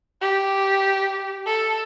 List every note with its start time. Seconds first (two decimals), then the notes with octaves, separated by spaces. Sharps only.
0.21 G4
1.47 A4